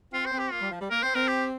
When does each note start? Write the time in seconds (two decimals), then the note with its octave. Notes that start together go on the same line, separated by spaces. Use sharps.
0.13 C4 F4
0.26 C5
0.32 C4
0.39 G4
0.52 A#3 F4
0.61 G3
0.71 F3
0.81 G3
0.90 A#3 A#4
1.02 C4 C5
1.15 C4 A#4
1.28 G4